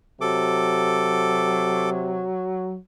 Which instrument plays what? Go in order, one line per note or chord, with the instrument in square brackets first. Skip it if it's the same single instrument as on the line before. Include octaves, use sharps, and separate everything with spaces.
[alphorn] C3 [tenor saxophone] F#3 [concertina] A4 D6